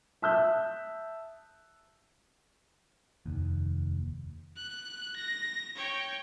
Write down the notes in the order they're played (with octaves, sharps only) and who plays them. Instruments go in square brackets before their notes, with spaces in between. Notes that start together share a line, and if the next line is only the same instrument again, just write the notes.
[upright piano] E5 A5 D#6 E6 F#6 G6
[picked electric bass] F1 D#2
[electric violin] F#6
A#6
C#5 G5